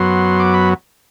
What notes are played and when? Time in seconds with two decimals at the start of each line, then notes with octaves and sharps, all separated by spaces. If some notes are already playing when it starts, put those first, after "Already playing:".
Already playing: F#2 F#3 B3 C6
0.39 D6
0.54 B5